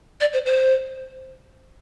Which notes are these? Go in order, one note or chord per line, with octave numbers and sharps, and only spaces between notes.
D5
C5
C5